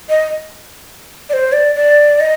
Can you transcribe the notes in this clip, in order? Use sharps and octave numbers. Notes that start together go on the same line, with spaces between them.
D#5
D5
C5
D5
D5
D#5